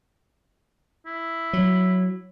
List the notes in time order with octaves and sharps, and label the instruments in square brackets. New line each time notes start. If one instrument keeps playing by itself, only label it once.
[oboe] E4
[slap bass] F#3